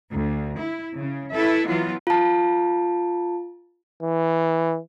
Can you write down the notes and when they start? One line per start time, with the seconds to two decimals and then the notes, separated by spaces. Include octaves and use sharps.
0.10 D2
0.58 E4
0.95 C#3
1.33 E4 A4 B4 E5
1.67 E3 F#3 B3 F4
2.07 F4 A5
4.02 E3